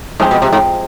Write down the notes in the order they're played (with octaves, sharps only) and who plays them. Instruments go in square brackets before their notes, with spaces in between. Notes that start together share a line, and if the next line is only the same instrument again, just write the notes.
[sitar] G#2 [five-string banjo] F3 G#3 C4 G4
[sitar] B2
C3
G#2